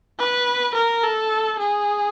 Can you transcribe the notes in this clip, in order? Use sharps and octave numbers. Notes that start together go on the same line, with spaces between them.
B4
A#4
A4
G#4